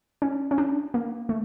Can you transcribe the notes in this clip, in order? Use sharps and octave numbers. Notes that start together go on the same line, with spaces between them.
C#4
C#4
D4
A#3
A3